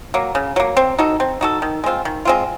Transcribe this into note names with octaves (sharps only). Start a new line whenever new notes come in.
F#3 A#3
C#3
F#3 A#3
C4
D#4 F#4 A4
C4
D#4 F#4 A4
D#3
G#3 C4 F4
D#3
G#3 C4 F4